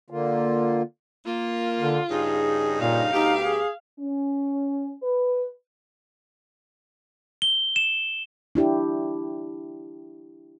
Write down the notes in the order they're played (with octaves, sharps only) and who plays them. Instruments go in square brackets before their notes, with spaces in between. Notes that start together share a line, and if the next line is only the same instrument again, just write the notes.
[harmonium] D3 A#3 F4
[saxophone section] A#3 [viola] F4
[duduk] D3
[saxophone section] G2 C#3 D#4 [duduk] G#4
[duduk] A#2 [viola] F5
[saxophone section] D2 B3 G4 [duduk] D#4
[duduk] G#4
[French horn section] C#4
B4
[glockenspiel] G7
E7
[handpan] D4 E4 G4